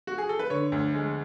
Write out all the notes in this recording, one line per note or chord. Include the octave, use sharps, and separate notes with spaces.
F#4
G#4
A4
B4
D3 C#5
D2
G#3